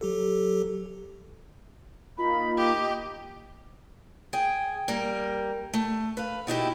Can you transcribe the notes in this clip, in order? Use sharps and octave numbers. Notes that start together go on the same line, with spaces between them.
F#3 G4 A4
A#3 D#4 F4 B5
G4 D#5
G#4 G5
G3 A#3 A#4
A3
B4 F5
B2 D#4 E4 G4